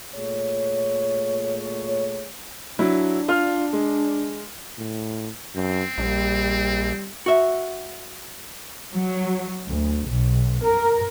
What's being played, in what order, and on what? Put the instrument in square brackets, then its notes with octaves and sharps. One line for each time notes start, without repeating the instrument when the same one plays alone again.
[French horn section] A#2 A3 G#4 C#5
[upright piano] F#3 E4 [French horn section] D4
[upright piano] F4 F6
G#3
[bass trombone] A2
[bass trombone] F#2 [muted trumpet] C4
[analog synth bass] A#1 [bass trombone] G3
[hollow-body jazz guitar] F#4 E5
[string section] F#3
D2
B1
A#4